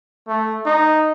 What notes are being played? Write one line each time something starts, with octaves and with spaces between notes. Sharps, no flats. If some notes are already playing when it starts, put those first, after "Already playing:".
A3
D#4